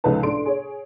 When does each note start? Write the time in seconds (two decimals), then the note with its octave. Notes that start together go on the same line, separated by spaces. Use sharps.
0.04 C#2 F3 D#4 A4 B4 A5
0.23 A2 D4 C6 D7
0.46 G#4 C#5